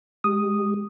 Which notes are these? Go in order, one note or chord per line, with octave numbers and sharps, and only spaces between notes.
G#3 G4 D#6